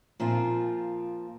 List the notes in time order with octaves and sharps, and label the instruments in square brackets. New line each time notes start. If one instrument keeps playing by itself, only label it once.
[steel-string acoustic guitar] A#2 F3 C4 F4